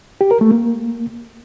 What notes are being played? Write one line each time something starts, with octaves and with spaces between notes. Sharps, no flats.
G4
A#4
A3
A#3